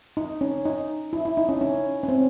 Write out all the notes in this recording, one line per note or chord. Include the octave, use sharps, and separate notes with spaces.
D#4
C#4
D#4
E4
E4
D#4
C#4
C#4
C#4
C4